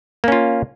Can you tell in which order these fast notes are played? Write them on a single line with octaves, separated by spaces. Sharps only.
A#3 C#4 F4